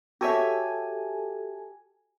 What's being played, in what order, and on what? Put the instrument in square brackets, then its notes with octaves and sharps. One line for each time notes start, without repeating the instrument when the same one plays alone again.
[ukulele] F#4 C#5 E5 [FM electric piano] G4 A4 G#5